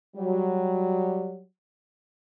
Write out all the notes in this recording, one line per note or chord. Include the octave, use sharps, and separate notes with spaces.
F#3 G3